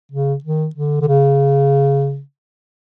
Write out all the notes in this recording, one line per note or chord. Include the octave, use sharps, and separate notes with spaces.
C#3
D#3
D3
D3
C#3